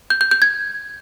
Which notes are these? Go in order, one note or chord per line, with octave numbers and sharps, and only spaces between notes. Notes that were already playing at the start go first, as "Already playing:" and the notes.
G6
G6
G6
G#6